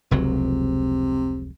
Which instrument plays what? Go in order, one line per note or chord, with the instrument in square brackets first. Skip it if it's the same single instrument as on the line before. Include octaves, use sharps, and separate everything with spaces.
[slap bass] F1 C#2 F#3 [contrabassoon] C3